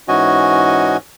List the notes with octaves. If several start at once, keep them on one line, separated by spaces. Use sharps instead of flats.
G#2 E3 C#4 F#4 D#5 G#5